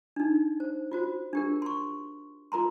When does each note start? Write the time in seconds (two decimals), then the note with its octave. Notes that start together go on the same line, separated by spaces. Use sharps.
0.16 D4 D#4
0.60 C5
0.91 F4 F#4 C5
1.33 D4 G4 A#4
1.62 C6 C#6
2.52 F4 A#4 A#5 C6